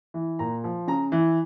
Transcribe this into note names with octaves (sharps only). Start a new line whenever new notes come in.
E3
A#2 A#5
F3
C#3 A#5
E3